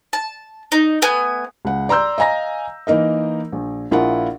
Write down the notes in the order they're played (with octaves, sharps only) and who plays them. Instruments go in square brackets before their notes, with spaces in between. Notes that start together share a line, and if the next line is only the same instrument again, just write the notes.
[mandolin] A5
D#4
A3 B3 G#5
[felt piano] C#2 F#5
D5 A#5 C6 E6 G6
D#5 F5 G#5 A#5 A#6
E3 A#3 D#4 A#4 D#5
A#1
A#1 E4 F4 A#4 F5 F#5